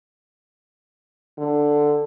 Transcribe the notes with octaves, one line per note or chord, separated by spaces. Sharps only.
D3